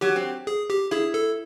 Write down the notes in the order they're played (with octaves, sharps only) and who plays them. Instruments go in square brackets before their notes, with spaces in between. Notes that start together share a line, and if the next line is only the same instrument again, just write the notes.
[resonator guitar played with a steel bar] F#3 [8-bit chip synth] G4
[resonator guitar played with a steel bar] C4
[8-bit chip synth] G#4
G4
[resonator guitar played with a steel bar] E4 [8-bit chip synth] G#4
[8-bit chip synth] A4